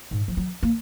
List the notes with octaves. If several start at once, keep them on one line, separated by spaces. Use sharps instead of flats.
G#2
F3
F#3
A#3